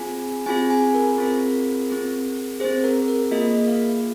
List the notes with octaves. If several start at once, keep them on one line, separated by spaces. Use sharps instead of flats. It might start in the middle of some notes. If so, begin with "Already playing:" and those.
Already playing: C4 F4 G#4 G#5
C4 F4 G#4 G#5
G#5
A#4
C4 F4 G#4
C4 G#4
C4 G#4 C5
A#4
A#4
A#3 F4 G#4 D#5
F5